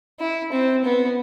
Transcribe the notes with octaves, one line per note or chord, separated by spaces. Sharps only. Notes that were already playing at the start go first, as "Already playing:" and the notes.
E4
C4
B3